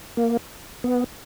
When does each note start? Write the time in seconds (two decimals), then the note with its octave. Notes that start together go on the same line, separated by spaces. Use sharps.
0.17 A#3
0.84 B3